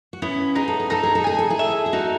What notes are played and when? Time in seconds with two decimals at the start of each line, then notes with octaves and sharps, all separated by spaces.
0.13 F#4
0.22 B3 C#4 E4
0.55 D#4 G#4
0.68 A4
0.80 G#4
0.90 D#4 A4
1.03 G#4
1.15 A4
1.24 G#4 G#5
1.39 A4
1.50 E4 G#4
1.59 E5
1.86 G#4
1.93 D#4 F#4 A4